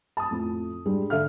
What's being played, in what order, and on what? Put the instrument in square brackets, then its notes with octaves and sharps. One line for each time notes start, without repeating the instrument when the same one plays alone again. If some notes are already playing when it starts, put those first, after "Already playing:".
[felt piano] A5 D#6
F2 A2
G3 G#3 D4
D3 A4 E5 F5 F6